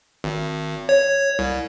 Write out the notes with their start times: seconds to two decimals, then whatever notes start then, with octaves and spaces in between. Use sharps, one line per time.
0.24 G#1
0.89 C#5
1.39 C2